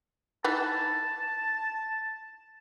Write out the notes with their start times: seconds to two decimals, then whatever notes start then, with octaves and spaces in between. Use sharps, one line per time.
0.44 E3 D#4 B4 A5